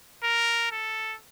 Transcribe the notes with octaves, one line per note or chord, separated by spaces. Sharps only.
A#4
A4